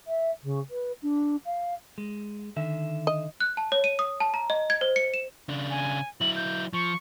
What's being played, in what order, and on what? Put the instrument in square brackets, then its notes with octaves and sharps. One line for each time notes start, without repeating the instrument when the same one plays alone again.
[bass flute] E5
C#3
B4
D4
F5
[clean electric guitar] G#3
D3 D#3 E5
[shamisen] D#5
[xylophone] F#6
A5
C#5
D#7
D#6
A5
A#5
D#5
G#6
C5
C#7
E7
[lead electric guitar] C#3 D4
[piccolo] G#5
[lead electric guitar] F#3 E4 [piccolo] F#7
[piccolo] G6
[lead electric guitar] F3 [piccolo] C#6